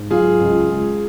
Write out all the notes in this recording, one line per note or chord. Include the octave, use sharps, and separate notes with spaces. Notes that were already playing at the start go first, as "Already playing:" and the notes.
Already playing: G#2
F#3 F4 G#4
C#2
G#3